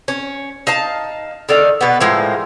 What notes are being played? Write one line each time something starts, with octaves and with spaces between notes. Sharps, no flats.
C#4
D#4 F5 A5
D#3 A4 D5 F5
B2 B3
A2 F3 G#3 A#3